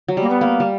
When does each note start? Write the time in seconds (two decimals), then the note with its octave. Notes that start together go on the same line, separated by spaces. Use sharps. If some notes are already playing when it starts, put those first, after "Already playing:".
0.08 F#3
0.17 G3 A#3
0.30 B3
0.41 A#3
0.60 G3